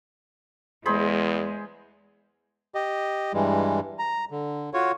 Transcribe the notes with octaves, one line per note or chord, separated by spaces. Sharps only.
E2 G#3 G#4 C5 B5
G4 D#5
G2 E3 G3 G#3
A#5
D3
F4 F#4 C#5